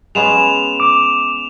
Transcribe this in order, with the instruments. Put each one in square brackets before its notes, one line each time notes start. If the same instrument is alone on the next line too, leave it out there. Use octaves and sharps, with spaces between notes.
[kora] G#3 B3 C#4 [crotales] E7 F7
[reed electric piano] D6